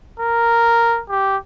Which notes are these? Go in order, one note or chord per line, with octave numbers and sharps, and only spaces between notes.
A#4
G4